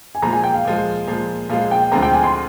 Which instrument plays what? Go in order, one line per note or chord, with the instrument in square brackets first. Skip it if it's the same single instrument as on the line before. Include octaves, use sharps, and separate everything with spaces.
[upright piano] G#5
[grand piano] A#2 F3 G#3 [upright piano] A#5
[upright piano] G#5
G5
F5
[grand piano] A#2 F3 G#3
A#2 F3 G#3
[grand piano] A#2 F3 G#3 [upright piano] F5
[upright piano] G5
[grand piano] D2 D3 F3 G#3 C4 [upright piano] A#5
[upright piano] G5
G#5
C6